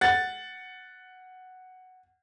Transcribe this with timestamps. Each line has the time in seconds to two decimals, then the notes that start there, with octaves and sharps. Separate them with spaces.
0.01 F#5 A6